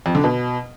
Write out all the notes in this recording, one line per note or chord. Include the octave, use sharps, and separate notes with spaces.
F2
D3
B2